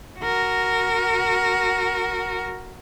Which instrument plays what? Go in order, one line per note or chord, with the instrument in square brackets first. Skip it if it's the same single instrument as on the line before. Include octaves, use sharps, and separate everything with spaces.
[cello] F#4 A#4